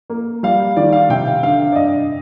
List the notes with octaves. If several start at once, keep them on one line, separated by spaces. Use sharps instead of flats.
A#3
G3 F5
D#3 D5
F5
C3 G5
F5
D3 F5
D5
G2 D#5